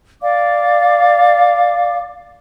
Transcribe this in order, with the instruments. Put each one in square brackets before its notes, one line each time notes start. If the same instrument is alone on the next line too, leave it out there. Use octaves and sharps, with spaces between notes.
[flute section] D5 F5 D6